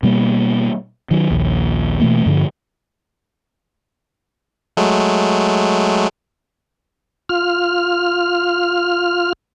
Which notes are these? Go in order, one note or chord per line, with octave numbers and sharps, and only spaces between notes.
B2 G3 A#3
D#3 F#3
A#1 D#2
B2 E3 A3 A#3
G2 D3 F3
F#3 G#3 A3
F4 F6